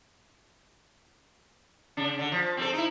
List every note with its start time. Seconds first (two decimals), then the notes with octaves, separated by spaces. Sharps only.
1.97 C#3 D4
2.19 D3
2.32 F3
2.57 C4 C#4 A4
2.73 D#4 E4